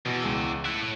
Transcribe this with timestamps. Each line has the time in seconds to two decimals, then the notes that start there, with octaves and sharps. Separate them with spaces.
0.05 E2 B2
0.22 C#2 G#3 E6
0.66 A3 E4 F#6
0.80 A2